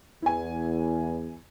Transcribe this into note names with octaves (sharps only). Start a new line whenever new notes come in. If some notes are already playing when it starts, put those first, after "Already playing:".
E2 E4 G#5